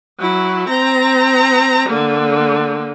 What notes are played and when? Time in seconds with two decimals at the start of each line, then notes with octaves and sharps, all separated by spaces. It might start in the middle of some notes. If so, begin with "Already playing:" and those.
0.19 F#3 E4
0.69 C4 A#5
1.89 D3 A#3